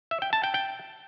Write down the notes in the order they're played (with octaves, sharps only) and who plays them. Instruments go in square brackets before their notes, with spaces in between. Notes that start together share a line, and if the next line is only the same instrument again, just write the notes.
[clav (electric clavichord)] E5
G5
A5
G5
G5